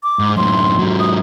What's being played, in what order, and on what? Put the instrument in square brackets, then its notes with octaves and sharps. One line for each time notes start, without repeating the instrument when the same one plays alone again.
[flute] D6
[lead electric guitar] G#2
[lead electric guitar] F#2 A2 [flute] C6
[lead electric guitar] G#2 F#3
[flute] D#6